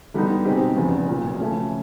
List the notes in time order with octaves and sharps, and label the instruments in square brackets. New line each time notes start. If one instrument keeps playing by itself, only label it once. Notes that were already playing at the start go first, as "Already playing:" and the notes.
[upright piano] D3 G3 B3 D#4
B2 G#3 C4 D#4 G4
F1 E2 C#3
B1 A#2 F3
C#3 F3 A3 C#4